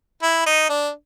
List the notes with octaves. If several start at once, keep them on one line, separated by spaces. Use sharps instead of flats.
E4
D#4
D4